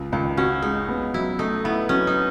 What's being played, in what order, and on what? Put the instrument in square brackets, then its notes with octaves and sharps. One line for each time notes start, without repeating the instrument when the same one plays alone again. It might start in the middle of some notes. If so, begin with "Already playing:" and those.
Already playing: [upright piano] C#2
[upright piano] C#2 [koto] D#3
[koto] C#4 [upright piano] F#4
[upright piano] G#3 [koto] D#4
[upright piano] B3
[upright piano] F#3 [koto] E4
[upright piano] A3 [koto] D#4
[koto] B3 [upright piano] E4
[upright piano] F#3 [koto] C#4
[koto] D#4